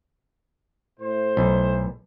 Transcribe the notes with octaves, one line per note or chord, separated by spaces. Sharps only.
A2 C5
B1